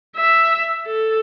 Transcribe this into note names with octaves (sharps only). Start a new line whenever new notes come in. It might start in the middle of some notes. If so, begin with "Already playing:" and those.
E5
A4